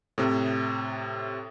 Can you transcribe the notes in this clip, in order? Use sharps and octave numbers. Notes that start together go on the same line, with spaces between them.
A2 C3